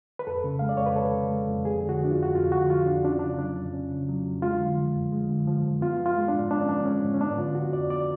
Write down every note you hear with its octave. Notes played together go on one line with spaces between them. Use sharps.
B4
F2 A4
C#3
G#3 F5
D5
F2 C#5
B4
F2 A4
C#3
G#3
F2
F2 G#4
D3
F#4
F3 D4
F4
F2
F#4
F2 F4
D3 F#4
F3 F4
F2 D4
C#4 D4
F4
C#3 D4
F#3 D4
F2
C#4
C#3
F#3
F2
G#3 F4
D3
F3
F#2
G#3
D3
F3
F#2
B3 F4
F3
F4
G#3
D4
G#2
B3 D4
C#4
F3 D4
G#3 C#4
G#2
C#4
B3 D4
D3 F4
F3 F#4
F2 D5
B3 D5